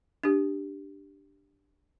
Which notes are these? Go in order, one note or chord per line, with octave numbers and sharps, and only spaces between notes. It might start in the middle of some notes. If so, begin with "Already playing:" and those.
D4 G4